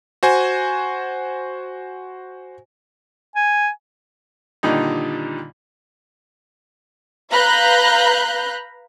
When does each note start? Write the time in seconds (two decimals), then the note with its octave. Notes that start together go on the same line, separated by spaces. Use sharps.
0.23 F#4 C5 G#5
3.36 G#5
4.63 A#2 D3 D#3 G3 D#4
7.31 B4 F5 A#5 B5 F#6 G6